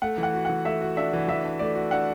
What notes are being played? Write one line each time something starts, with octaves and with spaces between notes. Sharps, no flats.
A3 F#5
E3
F#5
F#4
E3 F#5
A3 E5
F#4
D4 E5
E3
E3 E5
D4
A3 D5
F#4
D4 F#5